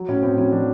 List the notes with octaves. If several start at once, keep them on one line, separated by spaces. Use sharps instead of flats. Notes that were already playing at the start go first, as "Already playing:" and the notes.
Already playing: F#3
A2 C#4
A2 C4
F#3 C#4
F#3 D4